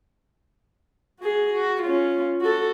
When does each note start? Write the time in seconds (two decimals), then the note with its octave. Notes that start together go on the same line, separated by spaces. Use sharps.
1.19 F#4 G#4
1.53 F#4
1.82 C#4 F4
2.41 F#4 A4